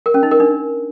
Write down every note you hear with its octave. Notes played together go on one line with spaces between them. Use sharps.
A#4
C#4
D#4
A#4
D4